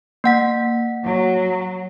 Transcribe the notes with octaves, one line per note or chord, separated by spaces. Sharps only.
A#3 F#5 B6
F#3